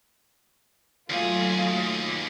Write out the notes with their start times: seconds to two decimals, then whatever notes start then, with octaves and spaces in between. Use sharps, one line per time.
1.10 D#2 F#3 A3 F4 G#4